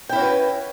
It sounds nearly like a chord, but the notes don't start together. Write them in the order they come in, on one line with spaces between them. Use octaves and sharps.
G5 E4 C#4 F#4 B4